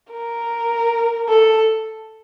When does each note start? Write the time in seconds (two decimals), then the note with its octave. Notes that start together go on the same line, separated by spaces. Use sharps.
0.12 A#4
1.29 A4